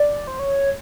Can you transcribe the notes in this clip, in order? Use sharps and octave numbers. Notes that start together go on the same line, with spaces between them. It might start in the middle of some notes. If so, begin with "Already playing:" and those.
Already playing: D5
C5
C#5